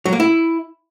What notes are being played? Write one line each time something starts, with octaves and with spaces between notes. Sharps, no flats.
F#3
A#3
E4